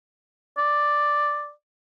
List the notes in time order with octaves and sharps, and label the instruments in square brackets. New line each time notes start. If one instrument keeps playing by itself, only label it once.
[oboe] D5